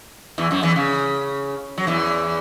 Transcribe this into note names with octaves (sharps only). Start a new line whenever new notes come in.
E2 E3
F#2 F#3
E2 E3
C#3
F#3
E2 E3